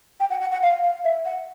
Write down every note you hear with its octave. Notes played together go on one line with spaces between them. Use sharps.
G5
F#5
F#5
F#5
F5
F5
E5
F#5